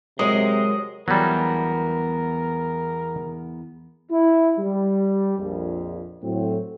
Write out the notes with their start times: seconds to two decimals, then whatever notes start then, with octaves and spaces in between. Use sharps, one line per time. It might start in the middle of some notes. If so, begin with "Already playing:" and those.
0.19 C3 F#3 G#3 A#4 D#5
1.08 E2 F#3 G3 B3 F#4 A#4
4.11 E4
4.58 G3
5.38 A#1 F2
6.23 A2 F#3 C4